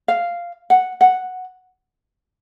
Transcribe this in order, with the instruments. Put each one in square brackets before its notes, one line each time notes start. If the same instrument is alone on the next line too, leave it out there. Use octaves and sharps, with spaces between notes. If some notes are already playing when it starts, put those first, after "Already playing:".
[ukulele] F5
F#5
F#5